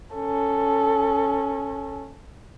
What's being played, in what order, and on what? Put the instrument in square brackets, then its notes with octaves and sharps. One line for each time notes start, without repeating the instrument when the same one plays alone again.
[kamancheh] C#4 A4